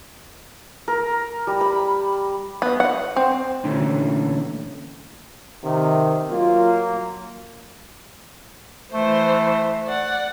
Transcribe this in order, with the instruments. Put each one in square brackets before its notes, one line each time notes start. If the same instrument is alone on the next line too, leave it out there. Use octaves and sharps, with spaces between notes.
[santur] A#4
G3
B5
[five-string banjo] B3
F#5
C4
[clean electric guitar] A#2 D3 E3 A3 C#4
[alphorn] C3 [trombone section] D#3
[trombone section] F#3 A#3 [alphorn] F4
[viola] E3 C5 [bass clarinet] A3
[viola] D5 F#5